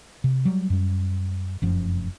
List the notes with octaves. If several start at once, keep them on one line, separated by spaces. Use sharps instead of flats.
C3
F#3 G3
F#2 G3
F1 F#2 F3